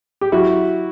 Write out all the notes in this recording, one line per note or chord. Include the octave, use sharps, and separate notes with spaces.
G4
F#3 E4 F#4